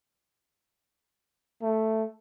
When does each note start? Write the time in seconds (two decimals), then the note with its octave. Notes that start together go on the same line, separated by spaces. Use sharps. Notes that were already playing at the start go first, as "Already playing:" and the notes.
1.62 A3